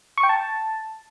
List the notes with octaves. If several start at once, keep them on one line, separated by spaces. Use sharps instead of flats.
C#6
G5
A5